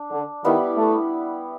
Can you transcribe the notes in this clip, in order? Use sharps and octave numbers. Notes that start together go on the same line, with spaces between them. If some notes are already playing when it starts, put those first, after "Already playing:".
Already playing: D4
D3
D#3 G3 B3 E4 G4
A3